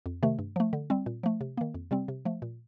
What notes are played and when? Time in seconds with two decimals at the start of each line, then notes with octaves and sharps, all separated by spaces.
0.06 F2
0.23 C3 D#3 A3
0.39 G2
0.56 F3 A3
0.73 D3
0.90 G3 C4
1.06 A#2
1.23 F3 A3
1.41 C3
1.57 D#3 A#3
1.74 F2
1.91 C3 G3 C4
2.08 C3
2.25 F3 A3
2.42 A#2